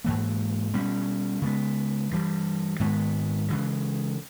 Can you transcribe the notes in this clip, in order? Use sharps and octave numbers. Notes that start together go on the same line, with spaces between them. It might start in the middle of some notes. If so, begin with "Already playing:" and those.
G#2 E3 A#3
B2 G3 C#4
C#3 G#3 B3
G2 E3 G3
G#2 D#3 G#3 B3
C#3 E3 G#3